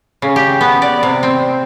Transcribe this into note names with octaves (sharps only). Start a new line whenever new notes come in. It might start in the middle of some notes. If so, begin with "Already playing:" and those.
C#3
G4
B3
D5
C3
C4